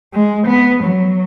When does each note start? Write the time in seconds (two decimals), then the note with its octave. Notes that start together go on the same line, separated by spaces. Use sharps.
0.14 G#3
0.47 B3
0.84 F#3